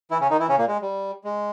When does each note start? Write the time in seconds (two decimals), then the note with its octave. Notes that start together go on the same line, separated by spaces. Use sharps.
0.11 E3 E4
0.21 C#3 C#4
0.30 D#3 D#4
0.40 E3 E4
0.49 C#3 C#4
0.58 A#2 A#3
0.68 G#3
0.82 G3
1.24 G#3